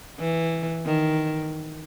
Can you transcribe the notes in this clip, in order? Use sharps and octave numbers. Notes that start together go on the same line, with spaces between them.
E3
D#3